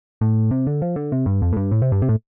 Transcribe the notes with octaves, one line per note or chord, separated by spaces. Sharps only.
A2
C3
D3
F3
D3
C3
G2
F2
A2
G2
A2
C3
G2
C3
A2